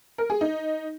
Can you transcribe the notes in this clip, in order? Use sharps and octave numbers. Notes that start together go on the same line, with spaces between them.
A#4
G#4
D#4